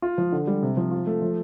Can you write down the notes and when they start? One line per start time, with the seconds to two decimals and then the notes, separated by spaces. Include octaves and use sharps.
0.02 F4
0.18 F3
0.32 D3
0.47 G3
0.62 C3
0.77 F3
0.91 F4
1.07 A3
1.22 F3